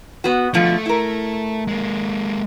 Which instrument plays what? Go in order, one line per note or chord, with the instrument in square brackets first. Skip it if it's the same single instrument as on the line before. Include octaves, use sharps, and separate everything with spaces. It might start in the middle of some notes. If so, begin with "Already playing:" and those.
[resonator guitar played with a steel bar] B3 F#4
[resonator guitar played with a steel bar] B2 D3 F3 [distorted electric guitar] A3
[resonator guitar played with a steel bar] E4 A#4
[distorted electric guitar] G#3 A#3